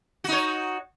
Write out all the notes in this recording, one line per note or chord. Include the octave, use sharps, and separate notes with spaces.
D#4 F#4 C#5